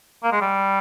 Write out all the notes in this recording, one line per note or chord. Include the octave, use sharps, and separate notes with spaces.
A#3
G#3
G3